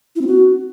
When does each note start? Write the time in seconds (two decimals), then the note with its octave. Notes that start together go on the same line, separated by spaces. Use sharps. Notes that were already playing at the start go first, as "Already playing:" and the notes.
0.16 E4
0.21 C4
0.27 F#4